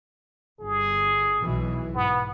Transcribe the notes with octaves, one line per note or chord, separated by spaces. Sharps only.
G1 G#4
B1 B2 E3
G#2 B3